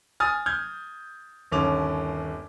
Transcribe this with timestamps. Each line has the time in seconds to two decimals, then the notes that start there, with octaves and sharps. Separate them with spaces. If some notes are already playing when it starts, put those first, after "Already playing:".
0.20 G#5 D#6 F6 A6
0.46 F6 G6 G#6
1.52 G1 D#2 C#4 D6 F7